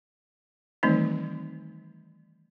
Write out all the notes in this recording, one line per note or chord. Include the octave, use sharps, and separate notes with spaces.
D#3 E3 G3 A3 C4 D#4